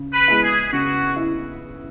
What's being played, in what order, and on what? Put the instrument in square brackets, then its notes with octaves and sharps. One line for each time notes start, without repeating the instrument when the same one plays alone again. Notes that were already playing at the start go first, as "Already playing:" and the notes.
Already playing: [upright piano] C#3
[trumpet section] B4
[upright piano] G#3 B3 E4
[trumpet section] G#4
[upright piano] C#3 [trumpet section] F#4
[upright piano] E4